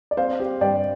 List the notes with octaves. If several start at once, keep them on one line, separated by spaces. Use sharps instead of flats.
D5
C4 C5 F5
G4
G2 D5 G5